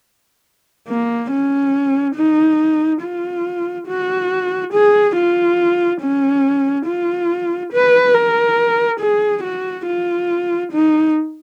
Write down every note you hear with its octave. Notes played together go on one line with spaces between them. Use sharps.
A#3
C#4
D#4
F4
F#4
G#4
F4
C#4
F4
B4
A#4
G#4
F#4
F4
D#4